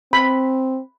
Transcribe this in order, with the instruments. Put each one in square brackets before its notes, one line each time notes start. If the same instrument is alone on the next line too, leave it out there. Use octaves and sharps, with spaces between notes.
[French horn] C4 [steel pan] B5